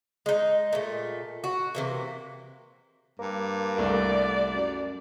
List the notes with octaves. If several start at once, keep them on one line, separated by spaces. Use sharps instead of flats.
G#3 D#4
A#2 A3
F#4
C3 E3 A#3
G2 A#3
C2 A3 D5
F#2